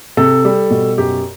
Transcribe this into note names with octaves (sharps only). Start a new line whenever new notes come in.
C3 A4
G3
B2
F#2 G4